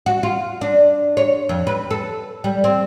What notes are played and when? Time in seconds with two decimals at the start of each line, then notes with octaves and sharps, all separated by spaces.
0.06 F#4
0.23 F4
0.61 D4
1.17 C#5
1.49 F2
1.67 B4
1.91 A4
2.44 G3
2.64 C4